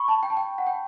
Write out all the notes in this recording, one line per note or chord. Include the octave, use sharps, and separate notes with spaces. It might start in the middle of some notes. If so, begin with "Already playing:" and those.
Already playing: B5 C#6
A5
G5
A5
G5
F#5
G5